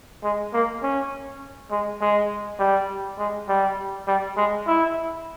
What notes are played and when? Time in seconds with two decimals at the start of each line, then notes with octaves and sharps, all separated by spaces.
0.24 G#3
0.53 A#3
0.83 C#4
1.71 G#3
2.01 G#3
2.59 G3
3.19 G#3
3.48 G3
4.07 G3
4.37 G#3
4.67 E4